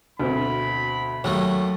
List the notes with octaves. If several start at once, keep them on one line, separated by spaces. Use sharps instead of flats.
D2 B2 C4 B5
D#2 F#3 A3